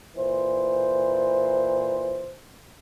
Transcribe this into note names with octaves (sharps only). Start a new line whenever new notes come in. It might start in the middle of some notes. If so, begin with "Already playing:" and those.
A#2 E3 C5